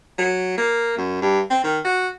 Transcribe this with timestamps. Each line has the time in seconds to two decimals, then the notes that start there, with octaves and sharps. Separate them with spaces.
0.18 F#3
0.57 A#3
0.98 F#2
1.22 G2
1.50 C4
1.64 D#3
1.84 F#4